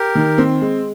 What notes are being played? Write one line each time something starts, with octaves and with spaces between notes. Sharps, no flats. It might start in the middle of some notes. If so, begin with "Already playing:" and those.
Already playing: G4 A#4
D#3
C4
G#3